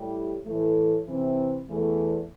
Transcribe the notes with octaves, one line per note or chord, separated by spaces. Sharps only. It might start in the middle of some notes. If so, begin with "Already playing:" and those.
Already playing: A2 G3 E4 G4
A2 E3 A3
C3 E3 C4
E2 E3 A3